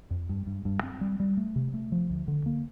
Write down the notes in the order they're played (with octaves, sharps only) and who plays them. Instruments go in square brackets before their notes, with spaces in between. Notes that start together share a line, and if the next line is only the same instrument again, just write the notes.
[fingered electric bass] F2
G2
G2
G2
C4
G3
G3
A3
C3
A3
F3
D2
D3
A#3